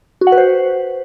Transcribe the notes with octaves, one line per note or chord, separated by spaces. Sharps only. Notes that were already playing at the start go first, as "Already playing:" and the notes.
F#4
F#5
B4
C5